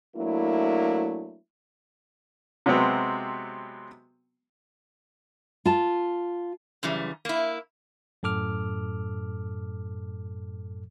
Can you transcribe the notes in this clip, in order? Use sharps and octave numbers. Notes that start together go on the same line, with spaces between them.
F#3 A3 A#3 D4 E4
C3 F#3 G#3 B3 C4
F4 A5
F#2 C#3 E3 G3
A#3 E4
F#2 A2 A4 D6 F6